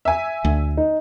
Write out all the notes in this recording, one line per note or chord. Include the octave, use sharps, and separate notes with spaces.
E5 G#5
D2
D#4